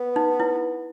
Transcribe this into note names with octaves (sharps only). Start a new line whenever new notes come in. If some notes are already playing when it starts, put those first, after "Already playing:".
Already playing: B3
D#4
E4